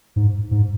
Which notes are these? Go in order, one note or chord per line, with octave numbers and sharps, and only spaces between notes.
G#2
G#2